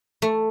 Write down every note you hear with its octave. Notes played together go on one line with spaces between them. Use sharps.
A3